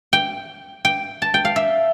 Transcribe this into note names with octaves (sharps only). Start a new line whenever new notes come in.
G5
G5
A5
G5
F5
E5